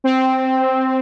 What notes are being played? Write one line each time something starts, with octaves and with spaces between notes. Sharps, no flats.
C4